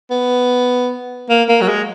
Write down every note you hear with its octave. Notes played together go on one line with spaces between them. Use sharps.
B3
A#3
A#3
F#3
G#3